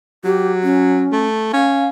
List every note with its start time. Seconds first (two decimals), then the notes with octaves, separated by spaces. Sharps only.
0.24 F#3 G4
0.63 C#4
1.12 A3
1.53 C#4 F5